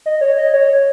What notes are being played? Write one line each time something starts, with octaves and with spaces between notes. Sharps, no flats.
D#5
C#5
D#5
C#5